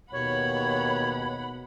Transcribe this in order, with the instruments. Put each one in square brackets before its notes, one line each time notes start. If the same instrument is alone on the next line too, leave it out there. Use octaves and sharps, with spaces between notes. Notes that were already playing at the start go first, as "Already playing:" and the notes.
[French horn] D#2 [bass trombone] B2 [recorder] C#5 [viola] F#5 B5